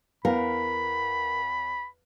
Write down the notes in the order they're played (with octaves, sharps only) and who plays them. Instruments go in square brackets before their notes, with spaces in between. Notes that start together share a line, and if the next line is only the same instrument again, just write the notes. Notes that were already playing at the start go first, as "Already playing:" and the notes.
[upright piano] E2 B4 F5 [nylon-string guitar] A#4 [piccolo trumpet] B5